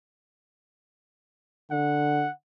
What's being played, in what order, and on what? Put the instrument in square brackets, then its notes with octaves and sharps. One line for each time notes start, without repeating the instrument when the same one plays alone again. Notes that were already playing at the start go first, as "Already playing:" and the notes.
[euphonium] D3 [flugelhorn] F#5